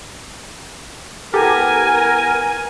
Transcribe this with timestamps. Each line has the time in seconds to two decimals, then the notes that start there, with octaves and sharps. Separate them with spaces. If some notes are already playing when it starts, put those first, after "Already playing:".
1.34 B3 E4 G4 A4 A#4 G#5